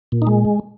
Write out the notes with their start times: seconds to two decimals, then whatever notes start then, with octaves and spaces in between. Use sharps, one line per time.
0.12 A#2
0.22 D#4
0.27 G#3